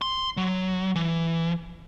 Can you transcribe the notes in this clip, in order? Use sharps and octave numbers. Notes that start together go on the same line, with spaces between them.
C6
F#3
E3